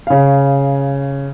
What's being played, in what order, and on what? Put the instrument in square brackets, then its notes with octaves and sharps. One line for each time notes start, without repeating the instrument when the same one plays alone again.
[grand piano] C#3 F5